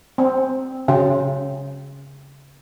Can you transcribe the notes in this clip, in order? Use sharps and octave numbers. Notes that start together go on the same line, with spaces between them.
C4
C#3